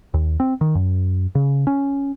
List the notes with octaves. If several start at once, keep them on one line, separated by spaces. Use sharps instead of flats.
D#2
C4
D#3
F#2
C#3
C#4